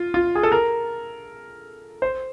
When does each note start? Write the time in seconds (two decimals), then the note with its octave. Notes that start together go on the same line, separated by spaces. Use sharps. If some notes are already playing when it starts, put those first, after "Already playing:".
Already playing: F4
0.14 F4
0.35 G#4
0.43 A4
0.52 A#4
2.02 C5